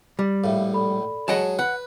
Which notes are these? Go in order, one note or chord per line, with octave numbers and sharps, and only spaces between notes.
G3
A#1 A2 E5 F5
A4 D5 B5
F#3 G#3 C#5 D#5 F#5 A5
B4 F#5 F#6